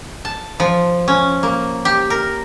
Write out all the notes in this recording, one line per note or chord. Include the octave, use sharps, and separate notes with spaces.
A5
F3
C#4
A#3
G4
A#4